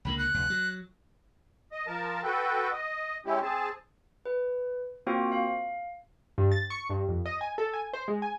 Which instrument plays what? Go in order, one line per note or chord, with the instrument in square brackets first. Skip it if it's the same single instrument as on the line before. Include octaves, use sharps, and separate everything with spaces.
[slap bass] C#2 D3 A#3 [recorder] B5
[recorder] F#6
[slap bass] F1 D2
F#3
[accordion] D#5
F3 A#4 A5
F#4 A4 B4 G5
D#5
G#3 C#4 E4 G4
C4 G#4 A5
[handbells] B4
A#3 C4 F4 F#4 C5 G5
F5
[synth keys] G2
A6
C#6
G2
F2
D#5
G#5
A4
G#5
C5
G#3
G#5